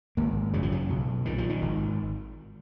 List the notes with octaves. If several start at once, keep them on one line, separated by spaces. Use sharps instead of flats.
G#1 A#3
F#2 C#3 F#3
F3
F#3
B1
A#2 D#3
F3
D#3
G#1